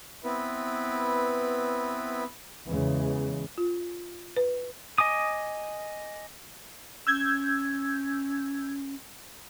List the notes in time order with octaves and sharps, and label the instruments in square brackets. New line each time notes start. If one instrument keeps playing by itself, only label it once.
[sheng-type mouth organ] B3 C4 E4 B4
[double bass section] E2 C#3 E3 G#3
[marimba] F4
B4
[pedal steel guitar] D#5 G#5 D6 D#6
[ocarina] C#4 [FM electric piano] E6 G6 G#6